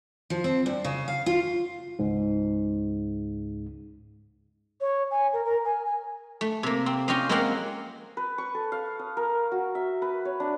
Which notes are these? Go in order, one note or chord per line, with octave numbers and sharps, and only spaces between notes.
F3
C4
G2
C#3
F5
F4
C#2 G#2
C#5
G#5
A#4
A#4
G#5
G#5
A3
C3 A#3
C4
C#4 F4 G4 D#5 F5
G#3 A#3 C4 F4 A#4 F#5
B4
C#6
A4
F5
D#6
A#4
F#4
E5
B4
C#5
D4